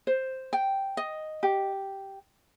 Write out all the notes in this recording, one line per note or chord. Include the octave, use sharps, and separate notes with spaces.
C5
G5
D#5
G4